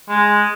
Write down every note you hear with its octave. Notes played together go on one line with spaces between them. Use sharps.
G#3